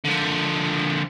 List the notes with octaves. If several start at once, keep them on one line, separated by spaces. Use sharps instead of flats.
D3 F3